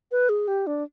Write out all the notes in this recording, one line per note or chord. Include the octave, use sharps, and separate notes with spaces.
B4
G#4
G4
D4